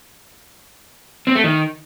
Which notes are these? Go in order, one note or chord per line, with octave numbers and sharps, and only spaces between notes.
C4
A3
D#3